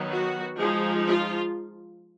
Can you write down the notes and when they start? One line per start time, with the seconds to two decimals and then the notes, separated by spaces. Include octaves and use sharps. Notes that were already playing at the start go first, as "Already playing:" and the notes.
Already playing: D#3 F#3 B3
0.09 F#4
0.56 F3 G#3 D#4 G#4
1.04 F4